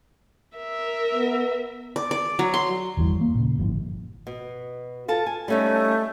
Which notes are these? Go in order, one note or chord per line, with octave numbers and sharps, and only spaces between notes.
A#4 E5
B3
D5
D5
F#3
C6
G1 E2 E3 G3
A#3
A#2 C#3
G1 G#2 F3
B2
F4 A4 A5
G#5
G3 A3 C#4 D#4